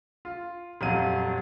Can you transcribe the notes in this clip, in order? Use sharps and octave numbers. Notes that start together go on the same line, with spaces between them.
F4
D#1 F2 F#3 F5 D#7